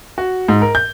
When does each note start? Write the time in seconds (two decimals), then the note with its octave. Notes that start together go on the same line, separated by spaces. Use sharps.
0.18 F#4
0.48 G#2
0.62 A#4
0.75 G6